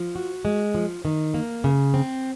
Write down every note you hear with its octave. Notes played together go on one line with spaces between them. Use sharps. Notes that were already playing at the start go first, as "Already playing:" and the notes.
Already playing: F3
F#4
G#3
F3
D#3
A#3
C#3
C4